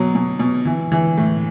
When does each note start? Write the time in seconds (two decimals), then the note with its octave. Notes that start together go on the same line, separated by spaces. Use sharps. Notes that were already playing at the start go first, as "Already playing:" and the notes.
Already playing: B2 F#3
0.15 B2
0.39 B2
0.65 E3
0.92 E3
1.17 A2